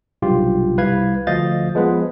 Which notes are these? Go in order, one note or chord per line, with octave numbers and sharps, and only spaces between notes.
B1 G2 C3 F4 G4
C2 B4 F5 G#6
D2 F3 D#5 F5 G6 A6
F3 G#3 B3 B4